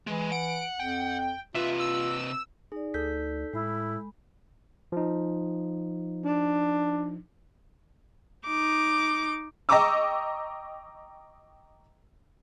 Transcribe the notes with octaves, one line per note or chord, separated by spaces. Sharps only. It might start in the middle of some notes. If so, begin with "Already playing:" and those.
E3 G#3
F#5 D7
F2 G5
C3 F4 B4 E5
E6
D#4 G#4 D5
D2 A4 G6 B6
A2 G#3 E4 B5
F3 D#4
D4
D#4 D6
D#5 G5 A#5 C#6 D6 E6